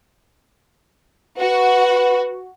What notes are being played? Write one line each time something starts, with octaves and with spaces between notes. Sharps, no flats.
F#4 B4